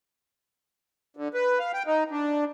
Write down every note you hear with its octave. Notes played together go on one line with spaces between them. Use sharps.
D3
B4
F5
G5
D#4
D4